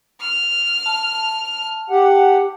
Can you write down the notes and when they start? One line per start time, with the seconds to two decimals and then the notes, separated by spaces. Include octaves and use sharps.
0.21 F6
0.86 A5
1.90 G4 F#5